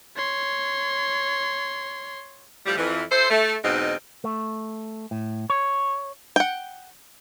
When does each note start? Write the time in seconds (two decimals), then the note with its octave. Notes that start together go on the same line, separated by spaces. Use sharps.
0.15 C#5 C6
2.66 A2 F3 G3
2.78 F2 E3
3.11 E4 A4 C5
3.30 A3
3.63 E2 G#2 B2 C4 D#4
4.24 A3
5.11 A2
5.50 C#5
6.36 F#5 G5